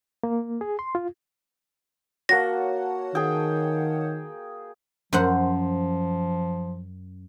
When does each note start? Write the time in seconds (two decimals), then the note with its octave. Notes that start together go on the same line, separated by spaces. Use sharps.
0.24 A#3
0.61 G#4
0.79 C6
0.95 F4
2.29 A#3 F#4 C#5 F#5 A5 A#6
3.15 D#3 G#4 G5
5.13 F#2 F3 C5 F#5